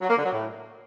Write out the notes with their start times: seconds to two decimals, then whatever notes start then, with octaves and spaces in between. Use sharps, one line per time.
0.02 F#3
0.09 A#3
0.17 D3
0.25 F#3
0.33 A2